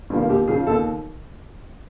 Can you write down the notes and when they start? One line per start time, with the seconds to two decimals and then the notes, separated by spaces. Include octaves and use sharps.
0.10 G2 D3 F3 A#3
0.29 D#2 G4
0.48 C#3 F3 G#4
0.67 D#2 A4